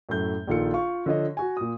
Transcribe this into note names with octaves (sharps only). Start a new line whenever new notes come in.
F#2 A2 A3 G6
A#1 D#3 F4 A4 C#7
F4 F5 C#6
D3 F3 C#5 D#5
F#4 G#5
A#2 D#6